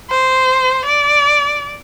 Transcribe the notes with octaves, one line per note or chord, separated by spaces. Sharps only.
C5
D5